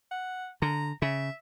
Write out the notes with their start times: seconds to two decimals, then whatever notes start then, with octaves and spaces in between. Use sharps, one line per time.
0.11 F#5
0.62 D3 A#5
1.02 C#3 E5